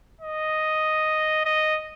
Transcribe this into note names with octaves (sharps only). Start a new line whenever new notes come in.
D#5
D#5